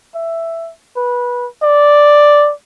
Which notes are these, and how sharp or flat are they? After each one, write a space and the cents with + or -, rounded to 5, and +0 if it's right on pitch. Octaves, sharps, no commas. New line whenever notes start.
E5 +10
B4 -20
D5 +0